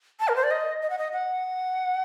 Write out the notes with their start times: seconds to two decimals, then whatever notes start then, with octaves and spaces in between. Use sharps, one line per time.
0.20 A5
0.28 A#4
0.36 C5
0.44 D5
0.51 D#5
0.82 D#5
0.90 F#5
0.98 D#5
1.13 F#5